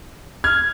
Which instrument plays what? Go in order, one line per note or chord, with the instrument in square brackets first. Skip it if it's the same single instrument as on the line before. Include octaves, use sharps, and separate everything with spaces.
[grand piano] F6 G#6